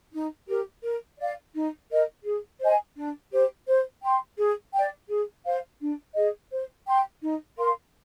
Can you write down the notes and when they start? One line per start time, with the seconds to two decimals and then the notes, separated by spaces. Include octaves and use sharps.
0.13 D#4
0.48 G4 A#4
0.83 A#4
1.18 D5 F5
1.54 D#4
1.90 A#4 D#5
2.24 G#4
2.60 C5 D#5 G#5
2.96 D4
3.31 G4 C5
3.67 C5
4.02 G5 C6
4.38 G#4
4.73 G5
4.78 D5
5.08 G#4
5.45 C5 F5
5.80 D4
6.15 G#4 D#5
6.51 C5
6.87 G5 C6
7.22 D#4
7.57 A#4 F5 C6